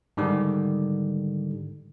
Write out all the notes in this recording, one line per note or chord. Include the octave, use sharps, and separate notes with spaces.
G#2 D3 D#3 G3